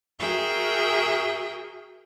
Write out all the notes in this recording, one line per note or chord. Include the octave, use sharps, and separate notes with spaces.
F#4 G#4 A#4 E5 G5